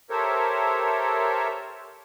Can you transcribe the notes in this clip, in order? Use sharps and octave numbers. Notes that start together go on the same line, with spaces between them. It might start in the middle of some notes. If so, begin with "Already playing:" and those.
G4 A4 A#4 C5 C#5 E5